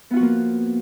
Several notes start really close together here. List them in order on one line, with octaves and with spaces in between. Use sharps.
B3 F4 F#4 F3 A#3